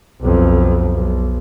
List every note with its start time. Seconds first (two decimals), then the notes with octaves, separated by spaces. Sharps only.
0.21 B1 F2
0.94 B1